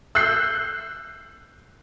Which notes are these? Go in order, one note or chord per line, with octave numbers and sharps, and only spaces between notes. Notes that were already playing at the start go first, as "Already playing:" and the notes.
E6 F#6 G6 C7